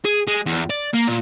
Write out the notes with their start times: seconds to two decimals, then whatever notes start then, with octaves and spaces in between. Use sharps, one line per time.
0.05 G#4
0.27 G#3
0.46 E2
0.70 D5
0.94 A#3
1.08 A#2